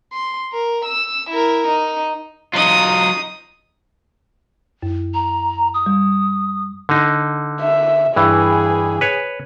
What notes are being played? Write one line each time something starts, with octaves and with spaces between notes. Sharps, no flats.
C6
A#4
E6
E4 A#4
D#4
F#3 D#4 F4 D#6
F#2
A#5
D#6
G3
D3 D#4
E5
G2 E3 G#4
B4 C#5